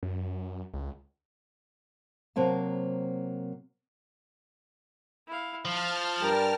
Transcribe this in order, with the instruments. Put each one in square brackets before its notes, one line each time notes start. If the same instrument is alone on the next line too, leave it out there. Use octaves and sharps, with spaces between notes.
[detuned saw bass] F#2
C#2
[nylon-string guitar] C3 F#3 A#3 C4 A5
[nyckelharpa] E4 F5
[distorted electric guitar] F3 [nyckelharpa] F5 [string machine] A5 F6
[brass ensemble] G2 G3 [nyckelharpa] A#4 G5